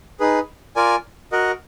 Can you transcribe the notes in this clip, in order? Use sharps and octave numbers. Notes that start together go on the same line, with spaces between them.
D#4 G#4 B4
F4 A#4 D5 G#5
F#4 A#4 D#5 F#5